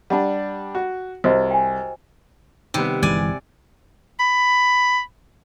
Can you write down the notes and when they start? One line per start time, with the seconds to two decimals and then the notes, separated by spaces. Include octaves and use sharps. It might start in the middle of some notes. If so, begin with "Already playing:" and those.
0.10 G3 D4 F#5 A5
0.75 F#4
1.24 C2 F#4 C5 D#5
1.51 G5 G#5
2.74 C3 D#3 G3 B3
3.03 G1 E3 G#3 D5 G#5
4.20 B5